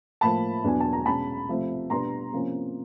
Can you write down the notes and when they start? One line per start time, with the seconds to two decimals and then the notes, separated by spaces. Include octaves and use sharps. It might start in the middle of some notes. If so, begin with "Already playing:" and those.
0.21 A2 F3 A#3 A5 B5
0.64 E2 B2 F#3 B3 D4 G#5
0.80 A5
0.93 A#5
1.06 B2 G#3 C#4 A5 B5
1.49 C3 F3 A3
1.90 B2 G3 B3 D4 A#5 C6
2.32 C3 F3 A#3 C#4